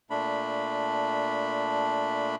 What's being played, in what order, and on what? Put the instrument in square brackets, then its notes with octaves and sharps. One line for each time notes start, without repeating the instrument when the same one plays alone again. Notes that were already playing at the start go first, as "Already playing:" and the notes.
[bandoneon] A#2 A3 D4 B5